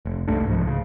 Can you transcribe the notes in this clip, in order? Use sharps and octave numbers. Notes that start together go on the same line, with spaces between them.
F1
C2 G2 A3 D4
C2 G#2 E3 F3
C#3